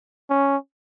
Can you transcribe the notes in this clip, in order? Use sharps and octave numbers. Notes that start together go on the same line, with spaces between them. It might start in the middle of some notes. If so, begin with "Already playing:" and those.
C#4